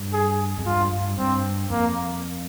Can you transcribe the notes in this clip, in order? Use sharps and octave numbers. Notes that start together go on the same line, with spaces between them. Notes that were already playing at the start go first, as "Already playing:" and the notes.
Already playing: G2
G#4
F2
G2 F4
G2
G2 C4
F2 A#3